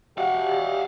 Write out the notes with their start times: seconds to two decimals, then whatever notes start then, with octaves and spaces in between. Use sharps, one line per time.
0.18 F#4 G4 F5 F#5